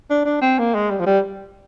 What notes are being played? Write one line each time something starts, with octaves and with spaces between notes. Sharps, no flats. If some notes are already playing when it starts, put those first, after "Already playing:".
D4
D4
C4
A#3
G#3
G3
F3
G3